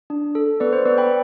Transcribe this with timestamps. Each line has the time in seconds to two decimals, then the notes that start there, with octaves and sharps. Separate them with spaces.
0.10 D4
0.35 A4
0.60 B3 B4 D5
0.73 C5
0.85 B3 B4 D5
0.98 G5 B5